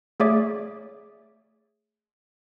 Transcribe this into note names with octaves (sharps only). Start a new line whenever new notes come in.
A3 G#4 C#5 D5 E5 D6